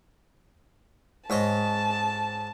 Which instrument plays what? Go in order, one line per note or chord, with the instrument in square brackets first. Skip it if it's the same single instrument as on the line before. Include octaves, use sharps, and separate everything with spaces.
[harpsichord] G#2 C#5 D#5 [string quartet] A5